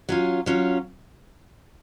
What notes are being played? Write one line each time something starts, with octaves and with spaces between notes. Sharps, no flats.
F#3 C#4 F4
F#3 C#4 F4